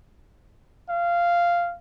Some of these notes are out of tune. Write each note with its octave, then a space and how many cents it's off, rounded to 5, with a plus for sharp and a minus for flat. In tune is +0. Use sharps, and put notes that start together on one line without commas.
F5 -10